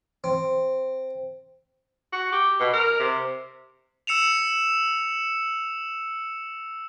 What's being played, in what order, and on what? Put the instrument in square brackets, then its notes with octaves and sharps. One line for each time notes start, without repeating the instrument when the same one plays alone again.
[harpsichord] C4
[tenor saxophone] F#4
G4
B2
A#4
C3
[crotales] E6 C#7 E7 F7